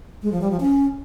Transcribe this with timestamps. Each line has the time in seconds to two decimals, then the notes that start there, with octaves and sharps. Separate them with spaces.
0.22 G#3
0.32 F3
0.41 G3
0.51 F3
0.60 C#4